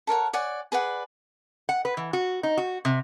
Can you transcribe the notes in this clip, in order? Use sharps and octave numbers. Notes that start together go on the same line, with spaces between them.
A4 A#4 C#5 F#5
C#5 D5 F#5 G#5
G#4 B4 D5 F#5
F#5
B4
E3
F#4
D#4
F#4
C3